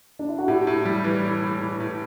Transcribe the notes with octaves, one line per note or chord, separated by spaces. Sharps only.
D4
E4
F#4
A2 E4 G4
A2
G3
E3
A2
A2
A2
A2